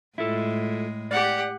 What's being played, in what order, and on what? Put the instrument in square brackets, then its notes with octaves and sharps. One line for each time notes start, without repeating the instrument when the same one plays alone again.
[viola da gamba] A2 G#3 [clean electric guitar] E4 F4 A4
[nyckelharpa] G4 F#5 [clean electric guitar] D5